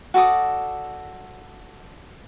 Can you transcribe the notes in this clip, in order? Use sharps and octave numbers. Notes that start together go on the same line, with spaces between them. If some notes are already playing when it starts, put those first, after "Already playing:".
F#4 A4 D5 D#6